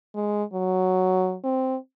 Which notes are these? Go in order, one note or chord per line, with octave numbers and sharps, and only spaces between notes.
G#3
F#3
C4